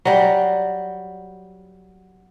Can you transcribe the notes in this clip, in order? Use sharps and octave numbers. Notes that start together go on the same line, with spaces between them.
F#3 G3